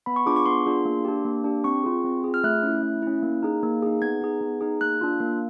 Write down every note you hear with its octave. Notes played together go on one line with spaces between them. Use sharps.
B3 B5
C#6
D4 F4 G#4 D6
C#6
B3 C6
D4 F4 G#4
A#3
D4 G4
A#3
D4 G4
C4 C#6
F4 G#4
C4
F4 G#4
F6
A3 F#6
C#4 E4
A3
C#4 E4
A#3
D#4 G#4
A#3
D#4 G#4
B3 G#6
D#4 G#4
B3
D#4 G#4
A#3 F#6
D4 F4
A#3